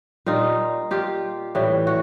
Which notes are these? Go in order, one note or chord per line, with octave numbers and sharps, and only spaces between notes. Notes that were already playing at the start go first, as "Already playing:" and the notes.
A#2 G3 D#4 F4
F4 G4
A2 E3 G3
F#4